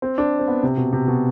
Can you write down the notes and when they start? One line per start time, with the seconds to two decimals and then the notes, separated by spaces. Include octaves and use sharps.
0.02 C4
0.18 D4
0.39 C4
0.48 B3
0.63 C3
0.77 B2
0.93 C3
1.08 B2